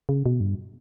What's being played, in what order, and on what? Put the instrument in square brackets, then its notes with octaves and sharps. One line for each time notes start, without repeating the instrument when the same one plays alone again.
[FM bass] C#3
B2
G2